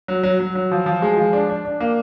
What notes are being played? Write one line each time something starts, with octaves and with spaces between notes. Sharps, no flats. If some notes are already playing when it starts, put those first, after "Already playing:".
F#3
F#3
F#3
F#3
F3
F3
G#3
F3
D4
D4
D4
A#3